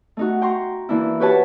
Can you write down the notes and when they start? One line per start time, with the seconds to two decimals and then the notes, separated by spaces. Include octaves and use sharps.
0.17 A3 D#4 F#4
0.42 G5 A#5 C6 C#6
0.89 E3 A#3 D4 E4
1.20 F#4 G4 B4 C#5 A5